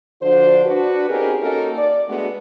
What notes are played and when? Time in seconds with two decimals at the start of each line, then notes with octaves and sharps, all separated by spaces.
0.22 D3 F3 D4 F#4 C5
0.66 D4 F#4 B4
1.09 C4 C#4 D#4 G4 G#4 A#4
1.42 A#3 C#4 D#4 F#4 A4 A#4
1.78 D5
2.09 G#3 A3 B3 D4 F#4